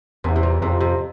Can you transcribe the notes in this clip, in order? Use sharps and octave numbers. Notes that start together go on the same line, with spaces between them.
E2 C3
C3
A#2
F2 C3
C3